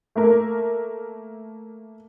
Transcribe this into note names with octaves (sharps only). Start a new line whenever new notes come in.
A3 A#3 A#4